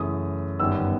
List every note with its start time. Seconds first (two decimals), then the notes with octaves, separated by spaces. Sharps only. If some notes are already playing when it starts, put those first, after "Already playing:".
Already playing: F#2 C#3 E3 A3 D#6
0.60 G1 F#2 D#3 G3 B3 E6